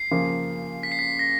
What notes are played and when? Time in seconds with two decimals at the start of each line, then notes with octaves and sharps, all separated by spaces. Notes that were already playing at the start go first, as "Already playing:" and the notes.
Already playing: C7
0.11 C#3 F3 A#3
0.83 B6
0.92 C7
0.99 B6
1.19 A#6